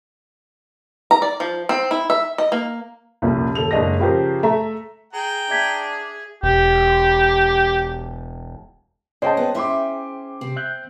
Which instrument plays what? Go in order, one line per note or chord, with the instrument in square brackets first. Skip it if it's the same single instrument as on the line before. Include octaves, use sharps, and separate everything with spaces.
[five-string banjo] A#5
D5
F3
C4
E4
E5
D#5
A#3
[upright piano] C2 F2 A#2 C#4
D#1 A4 F7
F#1 G#3 D4 G#4 D#5 A#6
C#3 F3 G4 G#4 A#4 C5
A3 E5 A#5
[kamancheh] G#4 [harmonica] G5 A#5
[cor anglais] D4 [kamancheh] G#4 [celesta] E5 G#6 B6
[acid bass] E1 [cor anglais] G4
[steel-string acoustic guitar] C#3 [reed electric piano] G#4 C5 G5 [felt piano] C#5 D#5 A5
[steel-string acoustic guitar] B3
[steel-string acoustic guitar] C#4 E5 [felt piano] E4 C6 D6
[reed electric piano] C3 [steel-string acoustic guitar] C4
[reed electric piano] E5 F#6 G6